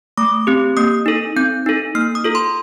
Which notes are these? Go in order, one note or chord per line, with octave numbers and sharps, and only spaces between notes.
A3 D6
C4 G4
A#3 D#6
D#4 A4
C4 G6
D#4 A4
A#3 F6
D#6
F4 A4
C6